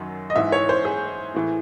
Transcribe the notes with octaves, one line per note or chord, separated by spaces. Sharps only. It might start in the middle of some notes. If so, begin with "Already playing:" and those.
Already playing: F#2 D#3 F#3
D#5
G#2 E3 E5
C#5
C5
G#4
A2 E3